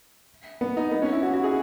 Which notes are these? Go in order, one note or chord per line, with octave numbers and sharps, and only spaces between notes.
B3
D#4
B3
C#4
E4
F#4
F#4
G#4